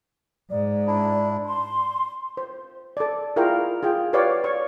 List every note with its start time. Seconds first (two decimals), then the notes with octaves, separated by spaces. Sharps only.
0.51 G#2 D5
0.87 D4 E4
1.46 C6
2.37 C5
2.97 A4 D5
3.36 E4 F4 G#4 A#4 F5 G5
3.83 F4 G#4 G5
4.13 F#4 G4 B4 C#5 D5 F5
4.44 C#5 C#6